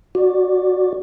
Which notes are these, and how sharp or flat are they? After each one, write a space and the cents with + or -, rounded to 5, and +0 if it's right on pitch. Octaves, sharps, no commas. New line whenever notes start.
F#4 -10 D5 +5